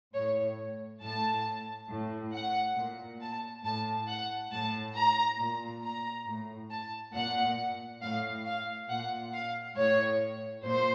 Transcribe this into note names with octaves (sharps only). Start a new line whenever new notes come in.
A2 C#5
A2 A5
A2
F#5
A#2
A5
A2 A5
F#5
A2 A5
A#5
A#2
A#5
A2
A5
A#2 F#5
A2 F5
F5
A#2 F#5
F5
A2 C#5
A#2 C5